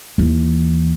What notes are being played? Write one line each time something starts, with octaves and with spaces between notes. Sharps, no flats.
D#2 E3